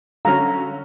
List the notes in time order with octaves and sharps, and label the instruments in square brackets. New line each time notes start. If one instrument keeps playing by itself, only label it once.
[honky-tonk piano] D3 F#3 C#4 [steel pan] F5 A#5